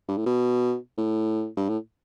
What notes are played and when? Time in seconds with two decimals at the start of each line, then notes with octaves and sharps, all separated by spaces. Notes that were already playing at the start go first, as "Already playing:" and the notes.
0.08 G2
0.17 A2
0.26 B2
0.98 A2
1.57 G2
1.69 A2